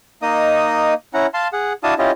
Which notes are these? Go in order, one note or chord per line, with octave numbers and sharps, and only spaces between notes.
A#3 D#4 D#5 D#6
C#4 E4 F#5 A#5
F5 A5 C6
G#4 F#5
D4 E4 F#4 F5 A5 D#6
C#4 E4 F4 G4 D#5